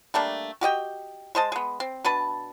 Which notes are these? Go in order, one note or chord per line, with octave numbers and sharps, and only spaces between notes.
G3 A3 A#3 D4
F#4 G4 D#5 G5
G#3 C5 D#5 A5
G#3 B3
C4
B2 D4 B4 A5